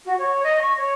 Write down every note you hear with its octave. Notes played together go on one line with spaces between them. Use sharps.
F#4
C#5
D#5
C#6
C#5